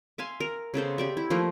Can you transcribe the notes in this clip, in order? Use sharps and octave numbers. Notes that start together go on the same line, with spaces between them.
E5 F5 G#5 C6
A#4
C#3 B3 A4 C5
G4 D5 E5
E4
F3 A3 A#3